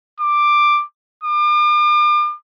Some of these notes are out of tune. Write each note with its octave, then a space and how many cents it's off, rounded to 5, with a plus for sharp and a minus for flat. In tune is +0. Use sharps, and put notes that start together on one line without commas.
D6 +10
D6 +40